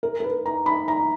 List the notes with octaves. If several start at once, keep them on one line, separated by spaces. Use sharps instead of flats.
A#4
A#4
B4
A#5
B5
A#5